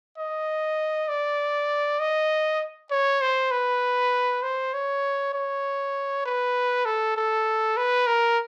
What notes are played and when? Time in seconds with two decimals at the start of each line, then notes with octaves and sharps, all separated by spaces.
0.18 D#5
1.08 D5
1.99 D#5
2.91 C#5
3.21 C5
3.51 B4
4.43 C5
4.74 C#5
5.33 C#5
6.25 B4
6.85 A4
7.16 A4
7.77 B4
8.07 A#4